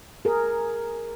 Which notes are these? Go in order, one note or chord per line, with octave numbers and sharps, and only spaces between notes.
G#4 A#4